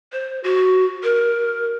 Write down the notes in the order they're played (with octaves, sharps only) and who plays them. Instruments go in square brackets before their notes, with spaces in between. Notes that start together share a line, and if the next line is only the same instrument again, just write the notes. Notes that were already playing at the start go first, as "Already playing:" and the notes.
[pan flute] C5
F#4
A#4